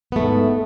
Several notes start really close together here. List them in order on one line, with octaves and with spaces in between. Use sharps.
B3 A3 G#2